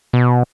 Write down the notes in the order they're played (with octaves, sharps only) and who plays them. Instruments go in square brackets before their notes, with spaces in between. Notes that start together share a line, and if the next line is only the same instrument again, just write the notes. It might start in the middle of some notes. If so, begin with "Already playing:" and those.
[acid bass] B2